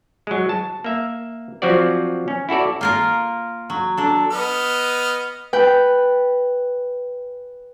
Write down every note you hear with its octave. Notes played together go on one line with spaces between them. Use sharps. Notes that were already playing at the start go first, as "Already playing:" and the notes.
F#3 G#3
A5
A#3 E5
F3 F#3 C4 F#4 D5
C#4
E4 F#4 A4 D5
A#3 F4 A#4
F#3
D4 A4
B3 D#5 F6
B4 G5